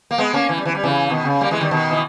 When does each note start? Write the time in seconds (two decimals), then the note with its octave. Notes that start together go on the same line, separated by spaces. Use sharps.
0.11 A#3
0.18 G#3 B3
0.33 A#3 C#4
0.49 E3
0.57 G3
0.65 E3
0.75 G3
0.83 C#3 E3
1.10 B2 D#3
1.25 C#3
1.41 G3 A#3
1.51 E3 G#3
1.60 D#3 G3
1.71 B2 D#3
1.91 E3